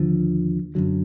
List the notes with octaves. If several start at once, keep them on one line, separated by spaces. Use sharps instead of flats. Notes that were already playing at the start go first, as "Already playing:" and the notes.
Already playing: D#2 D3 F3
F#2 D3 F#3